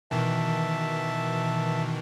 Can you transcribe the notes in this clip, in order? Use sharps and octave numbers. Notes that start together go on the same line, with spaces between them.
B2 D#3 E3 E5 A5